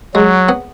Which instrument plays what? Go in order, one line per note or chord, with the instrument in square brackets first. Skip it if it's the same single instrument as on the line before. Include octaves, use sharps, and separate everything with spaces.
[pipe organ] F#3 [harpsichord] G#3
[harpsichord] B3